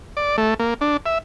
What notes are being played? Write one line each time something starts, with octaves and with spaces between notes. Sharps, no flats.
D5
A3
A#3
D4
E5